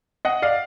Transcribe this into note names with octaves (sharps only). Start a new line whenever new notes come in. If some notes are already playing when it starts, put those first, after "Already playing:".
D#5 F#5
D5 F5